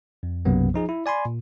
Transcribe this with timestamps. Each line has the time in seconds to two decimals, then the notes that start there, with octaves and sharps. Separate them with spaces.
0.23 F2
0.45 B1 F#2 C3 F#3 A#3 B3
0.74 F3 D#4 G#4
0.89 E4
1.06 D5 G#5 B5 C6
1.25 A#2